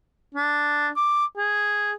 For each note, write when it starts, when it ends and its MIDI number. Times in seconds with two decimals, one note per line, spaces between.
0.35 0.90 62
0.97 1.25 86
1.37 1.92 68